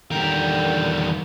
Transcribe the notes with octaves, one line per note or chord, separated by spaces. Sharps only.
E2 D3 D#3 G3 A#4 G5